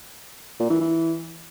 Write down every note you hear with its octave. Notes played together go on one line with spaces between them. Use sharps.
A#2
E3
E3